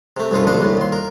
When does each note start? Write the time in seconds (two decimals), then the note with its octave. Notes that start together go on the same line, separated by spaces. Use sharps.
0.17 C3 A3
0.31 C2 F#2 B2 F4 A4
0.47 A#1 B2 D3 D4 D#5 C6
0.61 C2 A2
0.77 D#2 C6
0.92 A#4